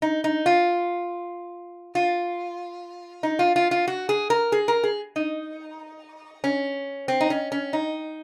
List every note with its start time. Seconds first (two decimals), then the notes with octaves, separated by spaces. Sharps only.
0.02 D#4
0.24 D#4
0.46 F4
1.95 F4
3.23 D#4
3.39 F4
3.56 F4
3.71 F4
3.88 F#4
4.09 G#4
4.30 A#4
4.52 G#4
4.68 A#4
4.83 G#4
5.16 D#4
6.44 C#4
7.08 C4
7.21 D#4
7.30 C#4
7.52 C#4
7.73 D#4